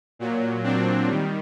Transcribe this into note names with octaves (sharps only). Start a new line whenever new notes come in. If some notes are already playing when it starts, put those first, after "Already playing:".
A#2 F#3
C4 D4
D#3 G3